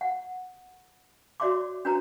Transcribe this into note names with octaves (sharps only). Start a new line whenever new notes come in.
F#5
F#4 C#5 D5 E5 C6 D6
D4 F#4 B4 C#5 A#5